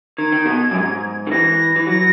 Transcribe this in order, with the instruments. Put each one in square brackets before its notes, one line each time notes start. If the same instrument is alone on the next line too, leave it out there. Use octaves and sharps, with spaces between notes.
[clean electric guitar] D#3 [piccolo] G#6
[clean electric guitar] D#3
B2
F#2
G#2
D#3
[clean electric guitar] E3 [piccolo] A#6
[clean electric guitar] E3
[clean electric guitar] F#3 [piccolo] A#6